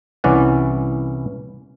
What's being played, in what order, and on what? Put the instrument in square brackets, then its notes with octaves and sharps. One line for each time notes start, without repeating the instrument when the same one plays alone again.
[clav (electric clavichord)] C2 E3 C#4 D5 F#5